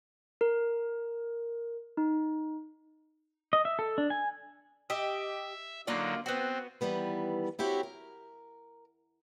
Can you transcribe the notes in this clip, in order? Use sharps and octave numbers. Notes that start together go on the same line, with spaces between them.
A#4
D#4
D#5
E5
A4
D4
G#5
G4 D#5 E5
D3 F#3 A#3 D#4 F4 D5
B3 C4 F#4
D#3 E3 G3 B3 B4
C4 E4 F#4 G4 C#5
A#4